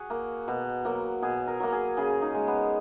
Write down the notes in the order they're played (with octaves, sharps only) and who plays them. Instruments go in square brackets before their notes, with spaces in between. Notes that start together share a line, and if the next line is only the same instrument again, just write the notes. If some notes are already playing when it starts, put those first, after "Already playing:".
Already playing: [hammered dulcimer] F#4 G#4
A#3
B2
F#3 A#3
B2 G#4
A#4
F#3 A#3
G#4
C#3 G#4
D#4
G#3
B3